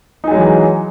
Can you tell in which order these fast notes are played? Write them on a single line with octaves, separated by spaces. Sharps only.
D#4 G#4 F#3 G#3 E3